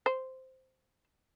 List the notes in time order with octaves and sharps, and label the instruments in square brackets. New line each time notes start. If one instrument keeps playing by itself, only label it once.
[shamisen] C5